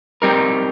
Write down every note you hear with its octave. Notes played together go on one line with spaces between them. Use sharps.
G3 C4 D#4 G4 A#4